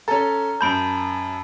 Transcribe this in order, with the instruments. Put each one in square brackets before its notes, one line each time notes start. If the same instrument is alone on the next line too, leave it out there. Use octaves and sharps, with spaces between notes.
[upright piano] C#4 A4 [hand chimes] A#5
[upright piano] F#2 G6 [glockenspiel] A5 B5 D7